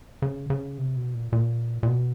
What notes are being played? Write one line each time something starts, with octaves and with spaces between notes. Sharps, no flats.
C#3
C#3
C3
B2
A#2
A#2
A#2
B2